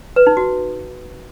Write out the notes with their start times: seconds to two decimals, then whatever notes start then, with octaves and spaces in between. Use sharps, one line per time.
0.16 B4
0.27 D#4
0.37 F#4